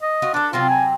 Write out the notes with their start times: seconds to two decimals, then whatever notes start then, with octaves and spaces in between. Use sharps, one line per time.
0.02 D#5
0.22 F4 F#4
0.34 D4 A4 B4
0.53 C3 F#3 C4 F4
0.69 G#5